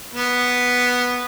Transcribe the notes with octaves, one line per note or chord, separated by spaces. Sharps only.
B3